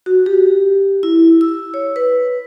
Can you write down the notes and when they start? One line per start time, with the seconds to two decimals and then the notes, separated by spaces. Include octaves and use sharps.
0.06 F#4
0.26 G4
1.03 E4
1.41 E6
1.74 C#5
1.96 B4